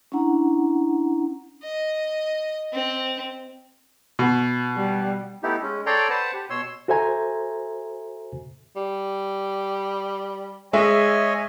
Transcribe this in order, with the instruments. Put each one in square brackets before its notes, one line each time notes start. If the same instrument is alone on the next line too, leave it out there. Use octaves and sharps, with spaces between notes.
[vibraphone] C#4 D4 E4 F#5 A#5
[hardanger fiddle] D#5
C4
[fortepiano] B2
[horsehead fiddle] G3
[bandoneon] A3 B3 D#4 E4 G4
G#3 C#4
A4 C#5 D5 G5 A#5 C6
B4 C5 F#5 A5
G4
B2 C#5 C6 E6
[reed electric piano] F#4 A4 C5 E5 G#5 A#5
[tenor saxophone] G3
[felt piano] G#3 E5 [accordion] C#5 D#5 G#5